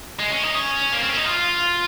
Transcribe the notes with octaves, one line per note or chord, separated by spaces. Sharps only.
G#3
C#4
D#4
C#4
A#3
C4
C#4
D#4
F4